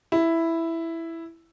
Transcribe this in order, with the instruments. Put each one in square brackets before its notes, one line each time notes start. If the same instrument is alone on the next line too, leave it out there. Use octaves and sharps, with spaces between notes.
[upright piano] E4